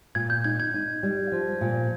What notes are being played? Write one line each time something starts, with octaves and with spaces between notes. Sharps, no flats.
A#2 G#6
G6
D#4 G#6
G#6
D#4
G3
F3
A#2